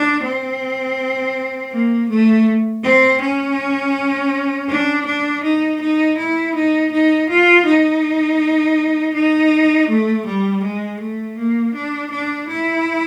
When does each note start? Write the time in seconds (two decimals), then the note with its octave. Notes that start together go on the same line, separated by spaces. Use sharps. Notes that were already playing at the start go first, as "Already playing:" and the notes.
Already playing: D4
0.24 C4
1.72 A#3
2.09 A3
2.83 C4
3.21 C#4
4.69 D4
5.06 D4
5.43 D#4
5.81 D#4
6.18 E4
6.55 D#4
6.92 D#4
7.29 F4
7.66 D#4
9.14 D#4
9.88 A3
10.26 G3
10.63 G#3
11.00 A3
11.38 A#3
11.74 D4
12.11 D4
12.48 E4